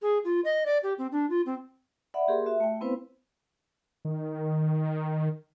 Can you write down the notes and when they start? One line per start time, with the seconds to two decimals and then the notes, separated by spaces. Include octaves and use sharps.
0.02 G#4
0.25 F4
0.45 D#5
0.66 D5
0.83 G4
0.98 C4
1.12 D4
1.30 F4
1.46 C4
2.14 D5 E5 F#5 B5
2.28 A#3 G4 G#4 A#4 C6
2.46 F#4 E5
2.60 A3 G5
2.81 B3 C4 E4 B4 C5 F5
4.05 D#3